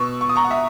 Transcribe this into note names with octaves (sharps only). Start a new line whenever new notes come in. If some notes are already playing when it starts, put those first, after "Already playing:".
Already playing: B2 C#6 E6
C#6
D#6
A#5 C#6
F#5
E5